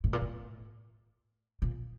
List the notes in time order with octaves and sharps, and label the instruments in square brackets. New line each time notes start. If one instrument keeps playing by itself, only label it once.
[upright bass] A2
A#2
A2
A#2